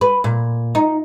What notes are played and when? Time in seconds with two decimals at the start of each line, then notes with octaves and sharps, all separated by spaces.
0.01 B4
0.24 A#2
0.75 D#4